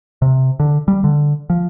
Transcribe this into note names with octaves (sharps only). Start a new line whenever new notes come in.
C3
D3
G3
D3
F3